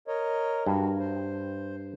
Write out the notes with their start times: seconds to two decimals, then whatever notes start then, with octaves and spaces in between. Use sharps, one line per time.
0.08 A#4 C#5 D#5
0.66 G2 F#4
0.99 C5